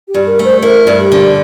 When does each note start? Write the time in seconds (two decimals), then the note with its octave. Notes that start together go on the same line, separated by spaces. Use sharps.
0.08 G4
0.14 G2
0.26 A#4
0.39 A3
0.45 C5
0.62 E4 A#4
0.87 G2
0.99 G4
1.12 D3